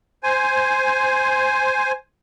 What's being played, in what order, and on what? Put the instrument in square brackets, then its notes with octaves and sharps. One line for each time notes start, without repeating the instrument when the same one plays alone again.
[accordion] C5 G#5